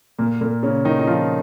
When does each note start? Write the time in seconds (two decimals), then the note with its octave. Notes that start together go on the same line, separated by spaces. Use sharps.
0.18 A#2 A#3
0.41 A#2 A#3
0.63 C#3 C#4
0.85 D#3 D#4
0.99 D#4
1.07 F3 F4